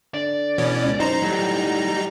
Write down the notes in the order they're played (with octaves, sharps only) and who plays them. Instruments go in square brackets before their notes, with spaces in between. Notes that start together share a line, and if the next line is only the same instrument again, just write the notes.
[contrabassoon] D3 [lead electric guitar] D5
[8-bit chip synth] B2 E3 C#4
[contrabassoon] C#2
[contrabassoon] F#2 [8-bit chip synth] D#4 A#5 [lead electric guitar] C5
[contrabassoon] A2 [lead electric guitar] F#3 G3